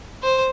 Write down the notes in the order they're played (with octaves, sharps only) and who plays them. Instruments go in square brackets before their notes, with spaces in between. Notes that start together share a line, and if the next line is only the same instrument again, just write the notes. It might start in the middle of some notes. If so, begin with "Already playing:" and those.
[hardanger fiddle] C5